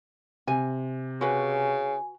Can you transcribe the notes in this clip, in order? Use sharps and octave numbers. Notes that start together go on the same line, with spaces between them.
C3 G#5
C#3 F#4 B4 G#5